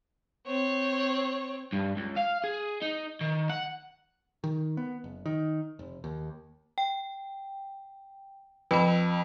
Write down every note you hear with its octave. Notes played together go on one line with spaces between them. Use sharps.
C4 C#5
G2
C#2
F5
G#4
D#4
D#3
F#5
D#3
B3
F#1
D#3
F1
D#2
G5
F2 B4 B5